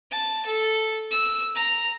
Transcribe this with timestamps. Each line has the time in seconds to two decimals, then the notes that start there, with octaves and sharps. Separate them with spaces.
0.11 A5
0.46 A4
1.11 E6
1.55 A#5